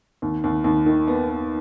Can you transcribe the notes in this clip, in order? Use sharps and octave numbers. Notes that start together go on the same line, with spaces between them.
D#2
D#2
D#2
D#3
B3
B3